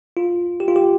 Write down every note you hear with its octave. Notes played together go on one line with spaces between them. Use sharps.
F4
G4
F4
G4